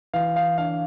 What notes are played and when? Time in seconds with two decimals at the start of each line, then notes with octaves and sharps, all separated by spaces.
0.14 E3 F5
0.36 F5
0.58 D4 F5